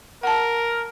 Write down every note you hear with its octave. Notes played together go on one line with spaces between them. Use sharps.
A#4 F#5 A5